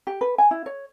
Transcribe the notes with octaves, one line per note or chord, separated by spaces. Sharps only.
G4
B4
G#5
E4
C#5